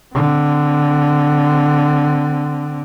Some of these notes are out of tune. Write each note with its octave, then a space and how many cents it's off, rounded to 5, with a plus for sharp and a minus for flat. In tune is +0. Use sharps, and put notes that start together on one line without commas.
D3 +0 C4 -25